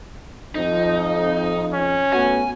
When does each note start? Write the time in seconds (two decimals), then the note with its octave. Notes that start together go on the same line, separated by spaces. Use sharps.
0.55 F2 D#4
1.73 C#4
2.13 A3 B3 F#4 G#5